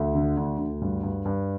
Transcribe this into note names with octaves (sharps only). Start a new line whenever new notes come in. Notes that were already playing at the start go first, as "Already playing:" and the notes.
Already playing: D2
D3
D2
D2
G2
G2
G2